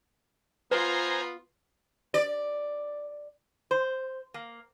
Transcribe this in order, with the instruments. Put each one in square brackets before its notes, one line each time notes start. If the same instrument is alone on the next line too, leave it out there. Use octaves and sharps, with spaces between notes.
[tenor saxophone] B3 [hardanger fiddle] F4 [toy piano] B4 [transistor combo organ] C5 G#5 A#5
[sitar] D5
[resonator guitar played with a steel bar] C5
A#3